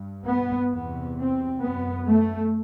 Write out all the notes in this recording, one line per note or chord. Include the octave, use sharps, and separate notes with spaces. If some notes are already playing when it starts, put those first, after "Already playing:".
Already playing: G2
B3
E2 C3 B3
C4
F#2 B3
A3